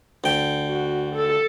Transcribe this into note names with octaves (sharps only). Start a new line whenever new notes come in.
D2 G5
F#4
A4